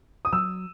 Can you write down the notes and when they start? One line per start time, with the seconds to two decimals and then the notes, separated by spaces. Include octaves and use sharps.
0.25 D#6
0.33 F#3 E6